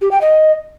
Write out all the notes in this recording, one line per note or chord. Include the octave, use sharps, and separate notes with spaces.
G4
G5
D#5